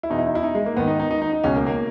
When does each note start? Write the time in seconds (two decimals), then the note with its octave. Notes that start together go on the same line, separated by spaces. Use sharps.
0.03 E4
0.10 E2 B2 D#4
0.19 E4
0.27 D#4
0.35 E4
0.43 D#4
0.55 G#3
0.66 A#3
0.77 G#2 D#3 B3
0.88 D#4
1.00 D#4
1.11 D#4
1.22 D#4
1.33 D#4
1.44 C#2 B2 C#4
1.56 A#3
1.67 A#3